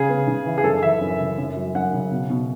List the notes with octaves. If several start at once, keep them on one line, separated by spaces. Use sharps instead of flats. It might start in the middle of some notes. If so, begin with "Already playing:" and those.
Already playing: C#3 G#4
B3
C#3
E3
G#4
F#2 A4
E3 E5
F#2
C#3
F#2
F#3
F#2 F#5
C#3
B2
B2